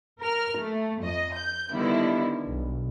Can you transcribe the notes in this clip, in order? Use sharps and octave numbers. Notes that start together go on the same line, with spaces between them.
A#4 F6
A3
F2 D#5
G6
D3 D#3 G3 B3 E4
B1